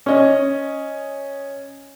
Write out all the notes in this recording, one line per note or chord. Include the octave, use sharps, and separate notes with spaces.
C#4 D#5